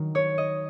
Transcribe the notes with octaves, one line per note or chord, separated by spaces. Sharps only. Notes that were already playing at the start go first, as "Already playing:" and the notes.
Already playing: D#3 F#3 D#4
C#5
D#5